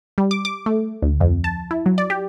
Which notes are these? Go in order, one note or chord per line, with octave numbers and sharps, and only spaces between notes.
G3
D6
D6
A3
D2
F2
A5
E4
F#3
D5
G4